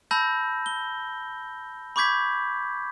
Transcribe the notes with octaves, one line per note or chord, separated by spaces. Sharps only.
A5 B5 E6 G6 A#6
G7
B5 C#6 D6 G6 G#6 B6